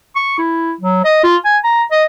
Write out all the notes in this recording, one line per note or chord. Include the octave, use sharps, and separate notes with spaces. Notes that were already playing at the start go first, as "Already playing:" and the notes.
C#6
E4
F#3
D#5
F4
G#5
A#5
D#5